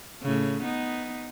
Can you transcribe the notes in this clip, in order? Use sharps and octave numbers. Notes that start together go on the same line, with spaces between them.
A2 C#3
B3 D#4